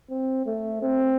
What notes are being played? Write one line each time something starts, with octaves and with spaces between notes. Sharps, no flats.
C4
A3
C4